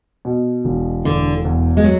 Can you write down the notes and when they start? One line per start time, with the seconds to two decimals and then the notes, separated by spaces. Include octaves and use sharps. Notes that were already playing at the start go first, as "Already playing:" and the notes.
0.25 B2
0.65 E1
1.05 E1 D3
1.45 E2
1.77 G#3
1.84 F#3